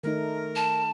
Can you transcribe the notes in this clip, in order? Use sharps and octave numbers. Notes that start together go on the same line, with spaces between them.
D#3 A3 D#4 A#4
A5